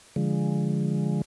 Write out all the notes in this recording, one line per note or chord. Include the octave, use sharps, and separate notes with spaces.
D3 F3 G#3